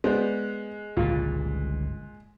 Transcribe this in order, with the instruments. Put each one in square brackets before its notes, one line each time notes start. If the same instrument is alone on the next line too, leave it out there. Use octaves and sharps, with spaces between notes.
[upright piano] G#3 [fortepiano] B3 C5 D5
[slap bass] G1 C#2 G2 [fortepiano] A#2